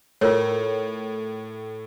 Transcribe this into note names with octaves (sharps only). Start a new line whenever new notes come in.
A2 F4 A#4 C#5